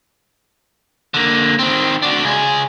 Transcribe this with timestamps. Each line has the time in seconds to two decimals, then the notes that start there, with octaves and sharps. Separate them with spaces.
1.14 D3 A#3
1.59 D#3 C4
2.02 D4 F#4
2.24 C#2 G#4